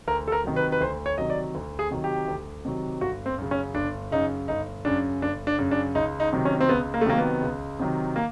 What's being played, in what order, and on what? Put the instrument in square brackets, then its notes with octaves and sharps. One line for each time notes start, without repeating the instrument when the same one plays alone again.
[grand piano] D2 A#4
A4
A#4
C3 D#3 F#3
B4
B4
D2 C5
C#5
C3 D#3 F#3 D#5
D5
D2
G#4
C3 D#3 F#3
G4
D2
C3 D#3 F#3
G1 F#4
C4
F#2 C#3
C#4
G1 D4
F#2 C#3 D#4
G1 D#4
F#2 C#3 D4
G1 D4
D4
F#2 C#3
D4
C#2 D#4
D#4
C3 D#3 F#3
C#4
C4
C#2 B3
A#3
A3
C3 D#3 F#3 A#3
B3
C#2
C3 D#3 F#3
A#3